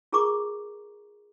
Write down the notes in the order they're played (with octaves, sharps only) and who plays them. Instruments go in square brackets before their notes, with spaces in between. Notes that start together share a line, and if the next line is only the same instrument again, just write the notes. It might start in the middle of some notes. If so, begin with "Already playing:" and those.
[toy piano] F4 G#4 A#4 A#5 C#6 D6